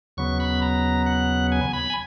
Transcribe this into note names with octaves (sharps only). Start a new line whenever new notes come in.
D#2 C#3 F#3 B3 C#6
B5
A#5
F#5
G#5
B5
G#5